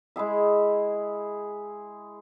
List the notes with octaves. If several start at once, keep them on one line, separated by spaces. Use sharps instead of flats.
G#3 E4 G#4 E5